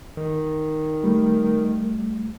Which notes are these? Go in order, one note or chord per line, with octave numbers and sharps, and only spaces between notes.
D#3
G3 A3